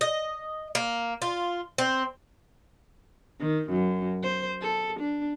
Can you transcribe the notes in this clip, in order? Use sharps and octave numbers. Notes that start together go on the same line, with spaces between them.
D#5
A#3
F4
C4
D#3
F#2
C5
A4
D4